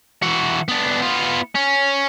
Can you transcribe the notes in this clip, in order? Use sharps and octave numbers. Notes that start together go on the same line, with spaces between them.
E3 F#4
B3 D4
B3 F4
C#4